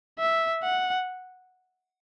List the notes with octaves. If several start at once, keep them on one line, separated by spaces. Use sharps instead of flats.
E5
F#5